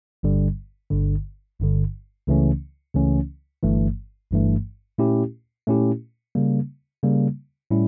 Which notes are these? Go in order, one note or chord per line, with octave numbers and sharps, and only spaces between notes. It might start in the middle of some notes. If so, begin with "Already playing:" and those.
G1 G2 D3 G3
G1 G2 D3
G1 G2 D3
C#2 C#3 E3 A3 C#4
C#2 C#3 E3 A3 C#4
G1 G2 E3 A3
G1 G2 E3 A3
A#2 A3 C#4 E4 G4
A#2 A3 C#4 E4 G4
C#3 G3 A#3
C#3 G3 A#3
A2 G3 C#4 E4